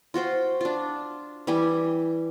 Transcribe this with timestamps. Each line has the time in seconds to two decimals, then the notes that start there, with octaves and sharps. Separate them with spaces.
0.14 F4 F#4 C5 G5
0.61 D4 F4
1.47 E3 G3 G4 G#5